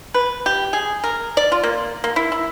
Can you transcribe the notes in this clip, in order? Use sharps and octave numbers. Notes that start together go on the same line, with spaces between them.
B4
G4
G#4
A#4
D5
F4
A#3
A#3
E4
E4